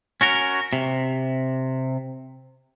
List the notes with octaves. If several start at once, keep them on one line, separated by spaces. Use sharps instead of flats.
C#4 F#4 A#4
C3